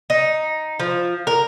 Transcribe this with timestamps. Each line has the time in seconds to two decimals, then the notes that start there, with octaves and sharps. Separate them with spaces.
0.10 D#4
0.80 F3
1.27 A#4